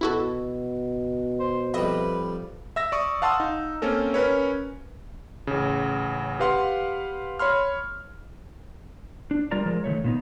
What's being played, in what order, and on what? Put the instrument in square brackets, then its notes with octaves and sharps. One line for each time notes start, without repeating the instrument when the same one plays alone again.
[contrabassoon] B2 [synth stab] E4 F#4 A4
[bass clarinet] C5
[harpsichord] F2 G3 [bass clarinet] B4 [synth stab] D#5 E5
[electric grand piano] E5 E6 A#6
D5 C#6 D#6
F5 F#5 A5 C6 D#6 E6
D#4
A#3 C4 C#4 A4 A#4
C#4 A#4 B4 C#5
A1 C#3
G4 B4 F5 F#5 C6
C#5 B5 C6 F6
[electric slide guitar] D4
G3 F4 A#4 D5 A#5
F3 G#3 A#4
D#3 E3 A3 C#5
A#2 B3 D#4